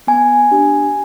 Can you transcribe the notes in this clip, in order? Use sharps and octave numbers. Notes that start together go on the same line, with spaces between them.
B3 G#5
D4 G4